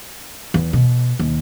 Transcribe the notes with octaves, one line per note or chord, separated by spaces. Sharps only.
E2
B2
D#2